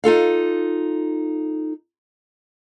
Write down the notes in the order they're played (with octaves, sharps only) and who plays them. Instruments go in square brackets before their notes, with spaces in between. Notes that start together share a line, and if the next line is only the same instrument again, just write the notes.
[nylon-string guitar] D#4 F4 A4 F5